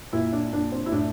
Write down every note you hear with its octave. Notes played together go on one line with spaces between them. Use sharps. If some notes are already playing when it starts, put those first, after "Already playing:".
A#2 E4
D4
A#2 D4
C4
E4
A2 D4